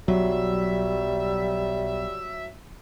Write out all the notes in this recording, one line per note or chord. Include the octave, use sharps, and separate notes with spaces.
B1 F#3 G3 E5